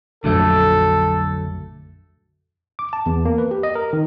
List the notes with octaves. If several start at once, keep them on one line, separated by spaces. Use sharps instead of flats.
A#1 F2 D3 F#3 A3 A4
D6
A5
E2
A#3
B4
G4
D#5
A#4
D#3